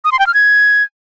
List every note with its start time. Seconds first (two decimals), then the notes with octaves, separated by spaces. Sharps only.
0.04 D#6
0.12 C6
0.19 G5
0.27 F6
0.34 G#6